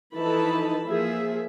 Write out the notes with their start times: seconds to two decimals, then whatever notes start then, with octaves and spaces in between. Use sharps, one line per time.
0.16 E3 F3 D#4 A4 A5 B5
0.86 F3 A#3 G#4 E5